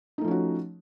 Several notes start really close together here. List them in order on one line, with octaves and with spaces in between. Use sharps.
D#4 A3 F3 C#4 F#4